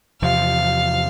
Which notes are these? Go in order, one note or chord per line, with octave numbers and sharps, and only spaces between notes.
E2 C3 F3 F5